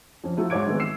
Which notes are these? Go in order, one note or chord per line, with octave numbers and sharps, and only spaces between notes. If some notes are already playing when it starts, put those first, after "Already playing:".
F2 C#4
F3 F#3 A3 E4
G#2 F#4 C#5 D6 G#6 D7
D#3 F#3 G#3 A3 B3 C4
E6 C7 E7